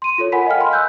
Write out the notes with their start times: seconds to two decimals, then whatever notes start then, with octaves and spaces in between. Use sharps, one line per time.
0.02 C6 D#7
0.18 F4 A4 C#5
0.32 A#4 F#5 G#5 B5 B6
0.46 D#5 F5 G5 F6
0.60 G#5 B5 C6
0.73 E6 F#6 G6